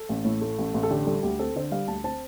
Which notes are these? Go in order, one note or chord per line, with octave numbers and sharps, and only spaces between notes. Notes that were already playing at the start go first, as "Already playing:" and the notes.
Already playing: A4
A1
A2
A3
A1
A1
A4
D3 G4
G3 A4
D2 G4
C4 A4
D3 C5
G3 F5
D2 A5
C4 A5